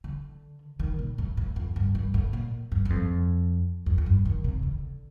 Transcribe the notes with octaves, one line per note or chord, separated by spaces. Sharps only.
D3
D#3
A#2
A2
A2
F2
G2
G2
A2
A#2
G2
G2
F2
F2
F2
G2
D#3
C3
D3